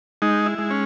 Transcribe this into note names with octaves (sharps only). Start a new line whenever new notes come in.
G#3 D#4
E4
G#3
C#4